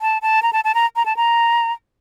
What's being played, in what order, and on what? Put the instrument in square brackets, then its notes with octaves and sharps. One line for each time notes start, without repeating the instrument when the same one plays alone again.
[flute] A5
A5
A#5
A5
A5
A#5
A#5
A5
A#5